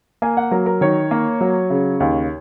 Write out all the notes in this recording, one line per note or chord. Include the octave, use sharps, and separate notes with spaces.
A#3 G#5
F#5
F#3 A#4
A#4
D#3 C#5
A#3
F#3
C#3
D#2